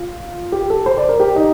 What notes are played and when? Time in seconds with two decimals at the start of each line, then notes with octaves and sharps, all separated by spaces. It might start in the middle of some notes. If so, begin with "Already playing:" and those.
Already playing: F4
0.52 G4
0.70 A4
0.86 C5
0.97 D5
1.09 A#4
1.20 G4
1.36 D#4